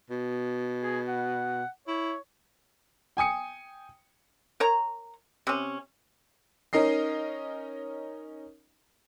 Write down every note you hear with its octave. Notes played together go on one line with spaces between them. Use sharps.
B2
G#4
F#5
E4 C#5
G5 G#5 D#6 C#7
A#4 C#5 A#5
C3 C#4
C#4 D#4 A#4 D#5 C7